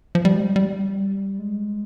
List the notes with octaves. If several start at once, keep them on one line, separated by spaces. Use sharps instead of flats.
F3
G3
G#3
G3
G3
G#3